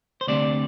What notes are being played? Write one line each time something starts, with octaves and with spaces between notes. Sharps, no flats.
C5
D2 C3 G3 D4 D5